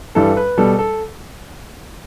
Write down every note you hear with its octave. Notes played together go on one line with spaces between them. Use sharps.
G2 E3 G3 A4
B4
B2 G3 A4
A4